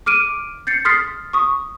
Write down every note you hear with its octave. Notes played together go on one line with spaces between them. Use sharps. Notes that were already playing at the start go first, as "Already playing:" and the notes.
D6 F6 D7 D#7
G6 A6 C7 C#7
C6 D#6 F6 A6 B6 C7
C#6 D#6